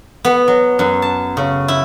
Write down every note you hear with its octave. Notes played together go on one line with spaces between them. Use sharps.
B3
F#3
F#2
A5
C#3
E4